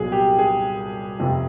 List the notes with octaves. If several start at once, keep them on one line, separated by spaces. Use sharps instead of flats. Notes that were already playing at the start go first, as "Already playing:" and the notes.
Already playing: C2 A#2 F#3 B3 G#4
G4
G#4
F1 F2 C3